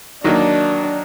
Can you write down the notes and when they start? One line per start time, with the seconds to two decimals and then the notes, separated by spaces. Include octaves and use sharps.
0.24 D#3 F#3 A#3 D4 D#4